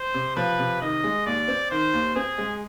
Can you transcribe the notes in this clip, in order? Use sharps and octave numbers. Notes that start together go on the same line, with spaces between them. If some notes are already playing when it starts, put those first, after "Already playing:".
Already playing: C5
C3
F3 B4
C3
D#3 D#5
G#3
D#2 D5
C4
D#3 C5
D#2
C4 G#4
G#3